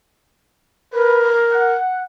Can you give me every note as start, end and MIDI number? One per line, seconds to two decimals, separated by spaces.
0.93 1.73 70
0.93 1.31 71
1.52 2.03 78